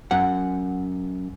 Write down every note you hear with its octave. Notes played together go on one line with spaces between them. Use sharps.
F#2 F#5